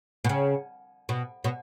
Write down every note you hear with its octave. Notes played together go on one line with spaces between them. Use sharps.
B2
C#3
B2
B2